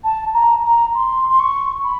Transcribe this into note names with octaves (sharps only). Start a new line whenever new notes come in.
A5
A#5
A#5
C6
C6
C#6
B5